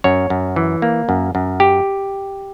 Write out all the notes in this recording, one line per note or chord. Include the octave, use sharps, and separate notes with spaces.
F#2 C#5
F#2
E3
A#3
F#2
F#2
G4